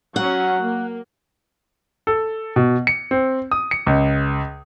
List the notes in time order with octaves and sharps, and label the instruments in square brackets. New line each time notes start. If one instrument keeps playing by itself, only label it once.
[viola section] F#3 C#4 [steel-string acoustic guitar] F#5
[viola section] A#3
[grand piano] A4
B2
C#7
C4
D#6
C#7
C#2